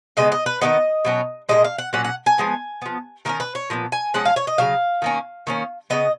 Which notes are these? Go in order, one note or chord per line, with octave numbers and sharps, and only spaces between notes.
C#3 G#3 B3 D#5
D#5
B4
D#3 G#3 B3 D#5
B2 F#3 C#4
A#2 F3 G#3 D#5
F5
F#5
A#2 F#3 C#4 F#5
F#5
G#5
F3 G#3 B3
F3 B3
D#3 A#3 C#4 A#4
B4
C#5
A#2 F3 B3
G#5
F3 G#3 C#4 F#5
F5
C#5
D#5
C#3 F#3 F5
D#3 A#3 C#4
D#3 A#3 C#4
C#3 G#3 B3 D#5